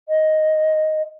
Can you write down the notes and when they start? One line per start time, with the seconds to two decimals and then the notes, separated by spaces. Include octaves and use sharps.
0.08 D#5